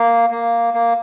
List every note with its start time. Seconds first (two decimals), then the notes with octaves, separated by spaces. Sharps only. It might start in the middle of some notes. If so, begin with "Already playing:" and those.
Already playing: A#3
0.31 A#3
0.74 A#3